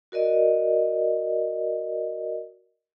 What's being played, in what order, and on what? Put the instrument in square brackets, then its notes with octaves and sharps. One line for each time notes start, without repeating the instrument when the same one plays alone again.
[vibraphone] F#4 A#4 D5 D#5